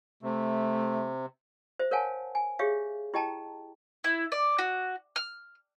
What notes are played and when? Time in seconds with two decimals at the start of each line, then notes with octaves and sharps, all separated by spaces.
0.23 C3 A3
1.79 C5 E5
1.91 A#4 C#5 F5 F#5 G#5 A5
2.35 G#5
2.59 G4 G#4 C#5 E5 F5
3.14 E4 G4 D#5 G5 A5 A#5
4.04 E4
4.32 D5
4.58 F#4
5.16 F6